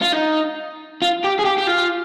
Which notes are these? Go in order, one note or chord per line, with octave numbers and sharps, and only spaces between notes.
F4
D#4
F4
G4
G#4
G4
G4
F4